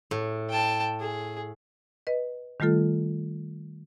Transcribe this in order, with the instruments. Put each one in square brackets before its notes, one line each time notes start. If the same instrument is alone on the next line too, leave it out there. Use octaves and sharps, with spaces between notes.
[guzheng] A2
[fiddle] G5 A5
G#4
[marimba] B4 D#5
D#3 G3 A3 F4 A4